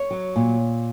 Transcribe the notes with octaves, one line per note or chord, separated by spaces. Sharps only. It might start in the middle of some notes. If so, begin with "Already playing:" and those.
Already playing: C#5
F#3
A#2